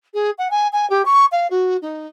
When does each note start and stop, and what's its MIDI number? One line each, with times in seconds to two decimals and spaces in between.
0.14 0.31 68
0.38 0.49 78
0.51 0.68 80
0.73 0.89 80
0.90 1.02 67
1.06 1.26 85
1.32 1.47 77
1.51 1.77 66
1.82 2.07 63